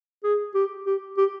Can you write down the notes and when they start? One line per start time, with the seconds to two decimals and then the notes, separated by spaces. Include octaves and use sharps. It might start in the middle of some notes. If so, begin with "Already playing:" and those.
0.24 G#4
0.55 G4
0.86 G4
1.17 G4